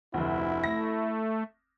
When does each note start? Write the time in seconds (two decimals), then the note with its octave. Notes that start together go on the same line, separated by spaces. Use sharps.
0.14 F1 D2 E4
0.64 A3 A#6